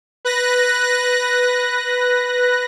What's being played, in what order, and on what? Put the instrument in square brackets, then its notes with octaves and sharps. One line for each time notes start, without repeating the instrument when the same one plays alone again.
[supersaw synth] B4 F#6 A#6